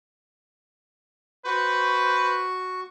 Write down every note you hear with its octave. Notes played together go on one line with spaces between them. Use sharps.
F#4 B4 C5 C#6